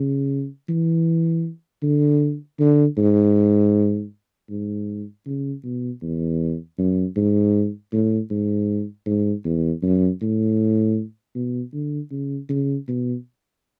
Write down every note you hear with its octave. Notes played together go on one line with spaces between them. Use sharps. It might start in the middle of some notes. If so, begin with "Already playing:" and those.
Already playing: C#3
E3
D3
D3
G#2
G#2
C#3
B2
E2
F#2
G#2
A2
G#2
G#2
E2
F#2
A2
B2
D3
C#3
C#3
B2